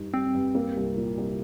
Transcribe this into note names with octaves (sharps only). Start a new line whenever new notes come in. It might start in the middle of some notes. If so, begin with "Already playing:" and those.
Already playing: G2 D#4
G3 C4
G2
A#3
C2
A#2
C2